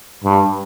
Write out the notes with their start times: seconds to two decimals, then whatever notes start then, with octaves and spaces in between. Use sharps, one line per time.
0.24 G2